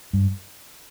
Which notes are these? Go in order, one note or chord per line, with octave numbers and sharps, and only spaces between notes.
G2